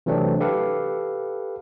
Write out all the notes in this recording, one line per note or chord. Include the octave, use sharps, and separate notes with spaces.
C3 E3 F#3 A3 C4 D4
G4 A4 B4 F5 F#5